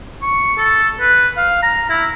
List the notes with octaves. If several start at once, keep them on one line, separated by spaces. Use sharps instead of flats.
C#6
A4
B4
F5
A#5
E4